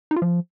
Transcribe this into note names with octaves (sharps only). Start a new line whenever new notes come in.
D#4
F4
F3